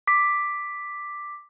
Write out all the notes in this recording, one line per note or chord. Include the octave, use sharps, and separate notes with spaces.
D6 B6